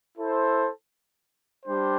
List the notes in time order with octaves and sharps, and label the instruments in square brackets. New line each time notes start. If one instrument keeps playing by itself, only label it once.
[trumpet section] E4 A4 C5
G3 D4 G4 C5